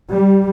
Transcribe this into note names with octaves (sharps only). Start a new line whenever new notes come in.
G3